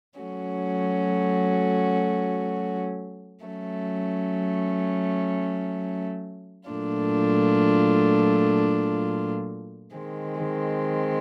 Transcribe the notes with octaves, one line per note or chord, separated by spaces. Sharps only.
F#3 A3 C#4 F#4
F#3 A3 C#4
A#2 F#3 A3 D4 F4
D#3 G#3 C4